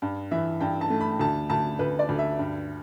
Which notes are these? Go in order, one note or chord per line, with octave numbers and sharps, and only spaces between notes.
G2
E3 E5
G2 G5
A5
A3
B5
D2 A5
D2 A5
D2 B4
D5
D2
E5
G2